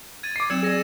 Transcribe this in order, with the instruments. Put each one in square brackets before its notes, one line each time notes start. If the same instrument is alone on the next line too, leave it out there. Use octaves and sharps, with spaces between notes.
[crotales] G#6 A6 D#7
[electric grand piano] D6 C7
[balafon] F#3 C4 [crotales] E6 C#7 E7 [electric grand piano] G#6
[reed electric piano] G#4 D5 [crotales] A#6 C#7 E7